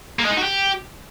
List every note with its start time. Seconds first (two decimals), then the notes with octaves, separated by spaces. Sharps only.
0.19 A#3
0.25 G#3
0.31 D#4
0.37 F#4
0.43 G4